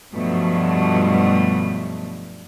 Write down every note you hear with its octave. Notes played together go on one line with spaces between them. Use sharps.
G2 B2 F3 F#3 A3